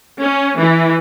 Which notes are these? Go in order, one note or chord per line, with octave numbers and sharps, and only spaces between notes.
C#4
E3